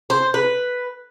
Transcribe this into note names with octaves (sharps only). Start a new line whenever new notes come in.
C5
B4